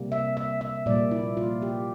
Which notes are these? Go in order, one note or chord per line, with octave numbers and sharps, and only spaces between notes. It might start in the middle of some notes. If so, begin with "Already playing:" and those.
Already playing: C3 G3 A#3
E5
E5
E5
A#2 G3 A#3 D5
E4
F4
G4